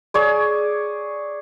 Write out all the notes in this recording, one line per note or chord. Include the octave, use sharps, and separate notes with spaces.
G#4 C#5 D5